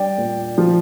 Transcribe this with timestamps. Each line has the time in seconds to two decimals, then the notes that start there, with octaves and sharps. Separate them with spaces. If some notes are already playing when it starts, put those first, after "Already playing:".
Already playing: G3 D4 D5 G5
0.18 A#2
0.58 F3